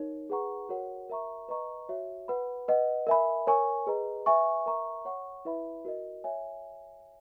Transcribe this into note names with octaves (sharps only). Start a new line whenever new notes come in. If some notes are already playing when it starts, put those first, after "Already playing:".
Already playing: D#4 A#4 C#5
G#4 B4 F#5 A#5 C#6
F#4 A#4 C#5 F#5
A#4 E5 A#5 C#6
B4 D#5 A#5 C#6
F#4 C#5 E5
B4 F#5 B5
B4 D#5 F#5
A#4 E5 G#5 B5
A#4 C#5 G#5 C#6
G#4 B4 D#5 A#5
B4 E5 G#5 C#6
A#4 E5 A#5 C#6
C#5 F#5 C#6
E4 B4 E5 B5
F#4 A#4 D#5
C#5 E5 G#5